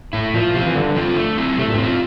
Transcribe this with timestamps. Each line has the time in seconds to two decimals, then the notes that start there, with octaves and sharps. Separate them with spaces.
0.13 A2 A3 E4
0.34 A#2 F3
0.54 C3 C4 F4
0.66 E3
0.75 G2 D3
0.95 F3 C4 F4 A4
1.17 A3
1.38 C4 E4
1.57 C3 A3
1.68 A#2
1.74 G2
1.78 A2 C4
1.83 F4